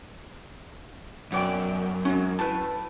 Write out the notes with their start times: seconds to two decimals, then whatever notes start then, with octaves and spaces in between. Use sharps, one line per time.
1.32 F#2 B2 D5 G5
2.05 F#3 G#3 C#4
2.39 A2 E4 B4 A5